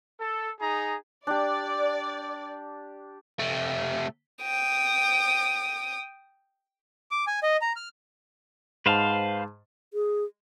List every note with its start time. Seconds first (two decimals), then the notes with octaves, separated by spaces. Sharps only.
0.20 A4
0.60 D#4 G#4 G#5 A#5
1.27 D4 G4 D5
3.39 C3 A3
4.43 G5 D#6
7.11 D6
7.27 G#5
7.43 D#5
7.61 A#5
7.76 F6
8.86 G#2 B4 C5 F5 A5
9.94 G#4